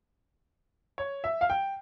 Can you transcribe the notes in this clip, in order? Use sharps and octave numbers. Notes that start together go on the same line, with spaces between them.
C#5
E5
F5
G5